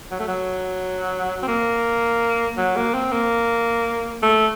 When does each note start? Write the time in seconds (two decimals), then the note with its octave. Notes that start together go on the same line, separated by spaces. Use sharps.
0.11 F#3
0.20 A3
0.28 F#3
1.43 C4
1.48 A#3
2.57 F#3
2.76 A#3
2.94 C4
3.12 A#3
4.22 A3